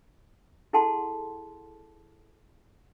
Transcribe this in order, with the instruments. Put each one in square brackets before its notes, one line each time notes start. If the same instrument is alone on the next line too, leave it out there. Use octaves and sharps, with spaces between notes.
[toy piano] E4 G#4 A4 F#5 A5 C6